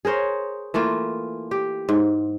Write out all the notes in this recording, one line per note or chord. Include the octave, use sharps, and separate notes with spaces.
G#4 A#4 C5 C#5
E3 A3 A#3 F4
G4
G#2